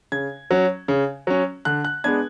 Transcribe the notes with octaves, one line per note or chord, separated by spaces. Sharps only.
C#3 G#6
F#3 C#4
C#3
F#3 C#4
D3 F#6
F#6
G#3 B3 D4 G#6